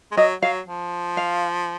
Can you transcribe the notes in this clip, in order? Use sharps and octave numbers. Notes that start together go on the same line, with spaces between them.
G#3
F#3 D#5
F#3 F5
F3
F5